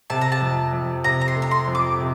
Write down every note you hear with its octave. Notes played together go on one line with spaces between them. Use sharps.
C3 A5
A#5
A5
F2
F2
C3 A#5
A#5
C6
A3
A#5
C6
F2
D6
C3